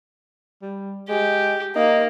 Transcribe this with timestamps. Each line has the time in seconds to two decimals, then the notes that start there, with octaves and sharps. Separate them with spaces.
0.62 G3
1.09 G#3 G4
1.76 A#3 D#4